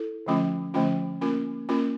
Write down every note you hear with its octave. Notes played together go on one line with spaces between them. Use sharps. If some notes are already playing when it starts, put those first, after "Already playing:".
Already playing: E4 A4
D3 F3 A3 C#4 F4
D3 F3 A3 C#4 F4
A#3 C#4 F4 A#4
A#3 C#4 F4 A#4